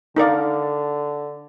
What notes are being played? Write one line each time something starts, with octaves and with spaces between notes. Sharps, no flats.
D3 D#4 A#4 D5 F5